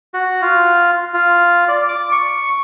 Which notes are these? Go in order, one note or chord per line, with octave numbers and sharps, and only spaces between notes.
F#4
F4
F4
D5
D6
C#6